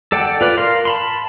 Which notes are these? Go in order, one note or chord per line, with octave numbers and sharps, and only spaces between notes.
A4 D5 F#5 G5
F4 B4 D5
A#4 F5 C6
A5 B5 C6